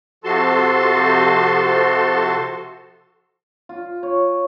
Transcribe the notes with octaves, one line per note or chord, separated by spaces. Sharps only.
C3 F3 F#4 A4 A5 C6
F4
C#5